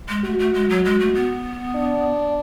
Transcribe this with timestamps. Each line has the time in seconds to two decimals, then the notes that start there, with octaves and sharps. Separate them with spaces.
0.09 G#3
0.24 A3 F#4
0.39 A3
0.54 G#3
0.70 F#3
0.85 G#3
1.00 A3
1.15 B3
1.75 D4